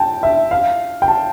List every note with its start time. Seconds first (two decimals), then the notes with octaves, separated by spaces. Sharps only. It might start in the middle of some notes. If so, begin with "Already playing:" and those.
Already playing: G5 A5
0.23 E5
0.51 F5
1.02 G5
1.08 A5